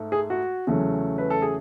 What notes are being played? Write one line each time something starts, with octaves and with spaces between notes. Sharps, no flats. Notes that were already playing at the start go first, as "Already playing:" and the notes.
Already playing: G#2 A3
G#4
F#4
E2 C#3 F#3 A3
B4
A4
G#4